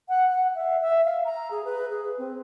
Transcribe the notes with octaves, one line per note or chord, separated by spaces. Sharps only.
F#5
F#5
E5
E5
F5
A#5
G#4
B4
G#4
C4